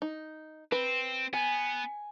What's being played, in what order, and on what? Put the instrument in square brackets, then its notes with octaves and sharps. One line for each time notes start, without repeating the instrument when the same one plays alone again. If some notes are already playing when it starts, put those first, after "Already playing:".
[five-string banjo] D#4
[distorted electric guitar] C4 [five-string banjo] B4
[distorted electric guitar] B3 [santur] G#5